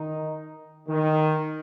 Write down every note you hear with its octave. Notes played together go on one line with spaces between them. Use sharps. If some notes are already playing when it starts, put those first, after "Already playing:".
Already playing: D#3 D#4
D#3